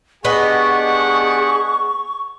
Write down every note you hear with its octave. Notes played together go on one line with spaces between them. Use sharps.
B3 D4 G4 G#4 D#5 F#5 C#6